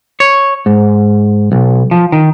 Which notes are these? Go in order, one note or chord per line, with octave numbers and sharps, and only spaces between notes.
C#5
G#2
B1
F3
D#3